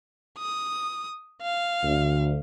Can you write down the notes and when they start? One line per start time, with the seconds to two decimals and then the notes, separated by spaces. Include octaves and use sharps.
0.38 D#6
1.42 F5
1.83 D2